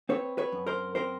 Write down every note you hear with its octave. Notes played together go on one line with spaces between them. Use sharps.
C4 B4 C#5
B4 C#5
F#2
A#4 C5
C4 A#4 C5